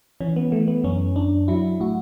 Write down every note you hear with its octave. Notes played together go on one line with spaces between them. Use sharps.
E3 C#4
B3
E3 A3
B3
F#2 C#4
F#2 D4
F#3 E4
A2 F#4